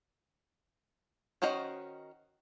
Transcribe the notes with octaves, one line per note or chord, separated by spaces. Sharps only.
D#3 C#4 F#4 C5 D#5